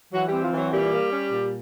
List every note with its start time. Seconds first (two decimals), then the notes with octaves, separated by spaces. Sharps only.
0.12 E3 F#3 F#4
0.27 G3 C4 G4
0.42 F3 F4
0.53 E3 F#3 F#4
0.71 A#2 G3 G4
0.91 A#3
1.11 C#4
1.32 A#2